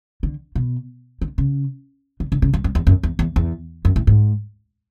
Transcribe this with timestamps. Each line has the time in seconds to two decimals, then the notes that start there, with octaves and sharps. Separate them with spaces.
0.23 D3
0.55 B2
1.21 D3
1.38 C#3
2.20 D3
2.32 D3
2.42 C#3
2.54 F#2
2.64 F#2
2.75 E2
2.87 F#2
3.03 E2
3.19 E2
3.36 E2
3.85 F#2
3.96 A2
4.07 G#2